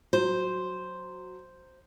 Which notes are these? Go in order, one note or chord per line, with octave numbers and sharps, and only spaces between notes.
F#3 C5